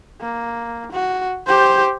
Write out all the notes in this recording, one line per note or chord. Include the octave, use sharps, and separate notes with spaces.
A#3
F#4
G4 C5